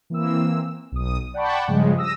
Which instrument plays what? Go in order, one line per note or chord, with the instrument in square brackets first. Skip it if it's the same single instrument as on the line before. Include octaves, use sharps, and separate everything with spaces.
[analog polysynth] E3 A#3 C4 E6
B1 D#6
D5 F#5 G5 A5 B5 C#6
G2 C#3 F3 G3 G#3
D#6 E6 A#6